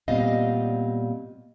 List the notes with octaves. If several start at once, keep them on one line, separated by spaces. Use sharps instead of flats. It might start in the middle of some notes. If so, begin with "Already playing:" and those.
A#2 G3 B3 C4 D#5 F5